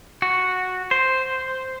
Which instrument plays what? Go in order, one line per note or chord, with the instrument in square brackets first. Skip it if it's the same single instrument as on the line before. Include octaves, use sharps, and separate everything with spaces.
[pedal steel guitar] F#4
C5